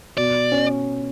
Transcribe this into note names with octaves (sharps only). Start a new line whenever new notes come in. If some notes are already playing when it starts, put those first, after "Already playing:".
B2 D5
C#4